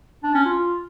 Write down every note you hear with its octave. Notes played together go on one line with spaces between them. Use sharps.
D4
C#4
F4